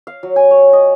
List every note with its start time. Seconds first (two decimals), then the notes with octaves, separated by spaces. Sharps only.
0.07 F5
0.23 F#3
0.36 G#5
0.51 C#5
0.73 D#5